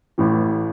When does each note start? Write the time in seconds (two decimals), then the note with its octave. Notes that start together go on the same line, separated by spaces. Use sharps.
0.18 A1 A2 E3